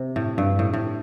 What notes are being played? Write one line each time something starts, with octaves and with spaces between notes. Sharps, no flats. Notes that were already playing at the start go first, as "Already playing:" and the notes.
Already playing: C3
A2
G2
A2
A2